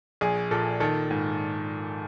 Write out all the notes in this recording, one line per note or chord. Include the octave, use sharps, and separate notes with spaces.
A#1 G#4
A#2 A4
D#3 A4
G#2